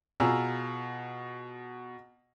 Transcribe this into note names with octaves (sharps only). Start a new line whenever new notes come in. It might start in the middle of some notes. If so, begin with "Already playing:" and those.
B2 F4 G#4 A#5 E6